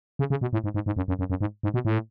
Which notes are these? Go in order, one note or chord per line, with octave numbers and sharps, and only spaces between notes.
C#3
C#3
B2
A2
G#2
G#2
G#2
F#2
F#2
F#2
F#2
G#2
G#2
B2
A2